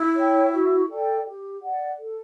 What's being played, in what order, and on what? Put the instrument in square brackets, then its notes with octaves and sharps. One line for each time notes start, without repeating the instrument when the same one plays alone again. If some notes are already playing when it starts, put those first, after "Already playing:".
Already playing: [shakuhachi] E4
[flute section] C#5
G5
F#4
A4 D5 G5
G4
D5 F#5
A4